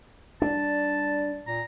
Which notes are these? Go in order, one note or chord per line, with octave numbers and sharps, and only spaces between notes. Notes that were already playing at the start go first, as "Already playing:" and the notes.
G3 D4 A5
A#2 A#5